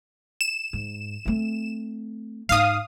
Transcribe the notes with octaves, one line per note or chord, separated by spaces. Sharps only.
E7
G#2
A3 C4
G#2 D#4 F5 D#6